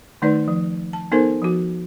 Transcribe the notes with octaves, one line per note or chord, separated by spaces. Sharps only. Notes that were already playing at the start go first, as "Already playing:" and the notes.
D#3 A3 D#4 B4 D5
F3
A5
B3 D#4 A4 A#4 C5
F3 F#4